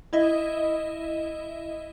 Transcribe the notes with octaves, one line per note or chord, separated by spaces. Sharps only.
E4 D#5 E5